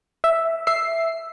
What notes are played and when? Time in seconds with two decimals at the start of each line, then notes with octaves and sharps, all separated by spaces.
0.24 E5
0.67 E5 C7